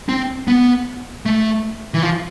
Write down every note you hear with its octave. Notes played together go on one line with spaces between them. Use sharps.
C4
B3
A3
E3
F3